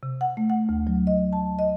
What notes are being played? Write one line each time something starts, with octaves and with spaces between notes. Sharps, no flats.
C3
F#5
A3
F#5
D2
F#3
D#5
A5
D#5